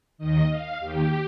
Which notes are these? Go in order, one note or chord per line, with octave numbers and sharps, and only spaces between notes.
D#2 D#3 D#5
F5
D#2 D#3 G4